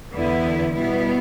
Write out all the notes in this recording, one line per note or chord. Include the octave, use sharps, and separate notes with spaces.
E2 D3 B3 E4
B2 G3 B3 E4